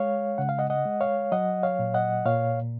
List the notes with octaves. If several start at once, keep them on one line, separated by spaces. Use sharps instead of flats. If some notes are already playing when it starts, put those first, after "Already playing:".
Already playing: G#3 C#5 F5
C#3 F#5
F5
D#5 F#5
D#5 F#5
G#3
C#5 F5
F#3 D#5 F#5
C#5 F5
A#2
D#5 F#5
A#2 C#5 F5